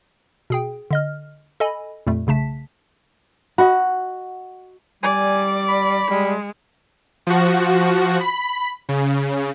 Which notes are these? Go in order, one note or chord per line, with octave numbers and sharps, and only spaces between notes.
B2 G#4 G5
D3 D#5 F6
A4 D#5 G#5 B5
F2 A#2 G3 A3
B1 C#3 A3 A5 B6
F#4 D#5 F#5 B5
G3 D5 G#5
B5
G3 G#3
F3 F#4
B5
C#3